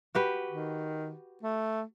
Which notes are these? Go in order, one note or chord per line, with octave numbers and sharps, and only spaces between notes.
F#4 G4 B4
D#3
A3